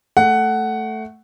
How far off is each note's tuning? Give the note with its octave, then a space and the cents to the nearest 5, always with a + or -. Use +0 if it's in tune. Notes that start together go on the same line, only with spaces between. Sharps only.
A3 +0 F#5 +10